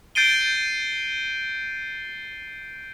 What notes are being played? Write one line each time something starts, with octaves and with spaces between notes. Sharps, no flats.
G6 A6 C7 D7 D#7 G7